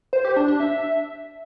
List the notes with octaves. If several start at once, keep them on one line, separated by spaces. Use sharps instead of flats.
C5
G4
D4
D4
E5